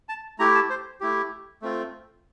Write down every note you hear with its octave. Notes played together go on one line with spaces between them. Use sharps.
A5
A3 E4 G4 A#5
A5
C5
A3 E4 G4
A3 C4 F4